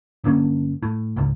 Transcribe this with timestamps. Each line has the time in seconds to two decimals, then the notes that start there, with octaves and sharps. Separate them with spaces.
0.24 G1 D3 A#3 C#4
0.83 A2
1.16 G#1 C#2